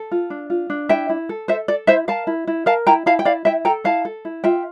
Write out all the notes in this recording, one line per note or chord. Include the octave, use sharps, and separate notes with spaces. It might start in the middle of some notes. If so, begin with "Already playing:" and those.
Already playing: A4
F4
D4
F4
D4
E4 E5 G5
E4
A4
A4 C5 E5
A4 D5
E4 C5 E5
A#4 F5 A5
E4
E4
A#4 F5 A5
E4 G5 A#5
E4 F5 A5
G5
E4 D5 F5
E4 E5 G5
A4 G5 A#5
E4 F5 A5
A4
E4
F4 E5 G5